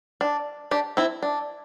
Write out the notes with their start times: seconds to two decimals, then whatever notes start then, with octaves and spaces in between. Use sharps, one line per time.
0.21 D4
0.71 D4 G4
0.97 C4 E4
1.23 D4